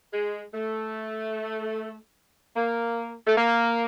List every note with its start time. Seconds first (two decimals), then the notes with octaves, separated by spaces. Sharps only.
0.13 G#3
0.53 A3
2.56 A#3
3.27 A3
3.37 A#3